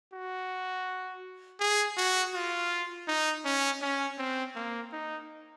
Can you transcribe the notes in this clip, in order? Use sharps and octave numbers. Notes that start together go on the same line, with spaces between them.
F#4
G#4
F#4
F4
D#4
C#4
C#4
C4
A#3
D#4